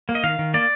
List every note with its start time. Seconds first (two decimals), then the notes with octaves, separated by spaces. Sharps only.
0.09 A#3
0.15 D#5
0.23 D#3 F5
0.39 D#3
0.54 A#3 D5